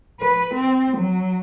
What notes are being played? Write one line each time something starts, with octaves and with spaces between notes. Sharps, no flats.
B4
C4
F#3